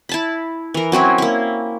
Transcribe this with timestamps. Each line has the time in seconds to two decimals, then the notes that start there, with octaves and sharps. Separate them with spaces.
0.09 E4 A5 B5
0.74 E3 A#4
0.92 F#3 C4 C#4 E4
1.18 A#3 E4